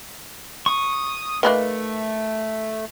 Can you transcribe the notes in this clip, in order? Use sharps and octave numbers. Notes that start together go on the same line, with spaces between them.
C#6 D#6
D#3 F3 A3 A#3 B4 B5 F#6